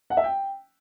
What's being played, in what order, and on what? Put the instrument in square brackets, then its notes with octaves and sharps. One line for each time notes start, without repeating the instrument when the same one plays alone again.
[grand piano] F#5
E5
G5